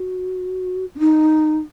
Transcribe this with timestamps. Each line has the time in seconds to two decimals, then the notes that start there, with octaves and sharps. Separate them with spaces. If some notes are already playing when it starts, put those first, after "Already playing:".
Already playing: F#4
0.95 C#4
0.99 D#4